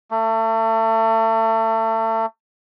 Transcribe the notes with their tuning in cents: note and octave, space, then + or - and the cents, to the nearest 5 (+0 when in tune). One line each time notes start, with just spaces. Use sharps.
A3 +30